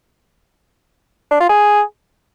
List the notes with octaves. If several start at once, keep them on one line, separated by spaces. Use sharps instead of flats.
D4
F4
G#4